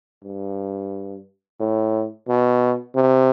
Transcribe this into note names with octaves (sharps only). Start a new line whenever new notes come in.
G2
A2
B2
C3